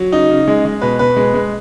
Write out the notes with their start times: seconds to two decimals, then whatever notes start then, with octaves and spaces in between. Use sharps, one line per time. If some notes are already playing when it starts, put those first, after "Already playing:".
Already playing: F#3
0.12 C#3 D#4
0.29 C#3
0.48 G#3
0.65 G#3
0.81 B2 B4
0.99 B2 B4
1.16 G#3
1.34 G#3